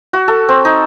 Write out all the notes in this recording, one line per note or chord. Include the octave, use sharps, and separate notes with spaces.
F#4
A4
C4
D#4